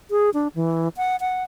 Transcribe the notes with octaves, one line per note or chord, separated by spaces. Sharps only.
G#4
D4
E3
F#5
F#5